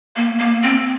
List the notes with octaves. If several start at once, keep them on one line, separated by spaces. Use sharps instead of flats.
A#3
A#3
C4